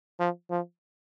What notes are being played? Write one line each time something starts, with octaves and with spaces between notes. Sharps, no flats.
F3
F3